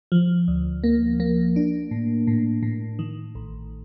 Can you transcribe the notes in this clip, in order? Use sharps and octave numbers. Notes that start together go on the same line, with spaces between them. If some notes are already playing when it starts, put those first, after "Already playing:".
F3
D2
A#3
A#3
D4
A2
A2
A2
D#3
A1